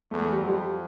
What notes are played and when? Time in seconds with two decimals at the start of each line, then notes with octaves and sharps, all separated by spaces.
0.11 E2 A3
0.22 A3
0.32 G3
0.40 F2 F#3
0.48 G3